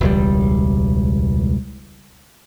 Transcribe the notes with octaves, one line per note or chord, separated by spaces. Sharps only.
E1 C#2 G3